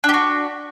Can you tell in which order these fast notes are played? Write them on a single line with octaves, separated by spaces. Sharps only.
D4 G4 F#4